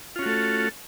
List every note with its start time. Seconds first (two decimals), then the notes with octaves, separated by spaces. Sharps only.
0.16 F4
0.19 C#4
0.22 F#4
0.26 A3
0.29 A4